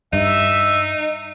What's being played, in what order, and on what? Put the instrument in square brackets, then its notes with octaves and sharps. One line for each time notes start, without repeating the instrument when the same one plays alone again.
[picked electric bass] G2 [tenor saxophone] D#4 [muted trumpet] E5